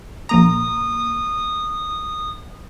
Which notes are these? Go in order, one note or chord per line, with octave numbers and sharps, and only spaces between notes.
A#1 A#3 A#5 D#6